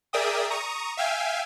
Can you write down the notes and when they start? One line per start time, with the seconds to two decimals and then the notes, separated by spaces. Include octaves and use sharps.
0.13 G#4 A#4 D5 E5 G5 D#6
0.50 A#5 C#6 D#6
0.97 E5 F5 G5 G#5